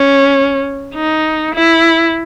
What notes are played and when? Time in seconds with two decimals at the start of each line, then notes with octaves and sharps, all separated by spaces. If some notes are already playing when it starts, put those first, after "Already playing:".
Already playing: C#4
0.95 D#4
1.54 E4